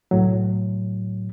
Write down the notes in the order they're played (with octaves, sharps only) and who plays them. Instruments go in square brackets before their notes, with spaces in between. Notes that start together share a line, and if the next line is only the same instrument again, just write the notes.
[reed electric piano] C2 A2 F#3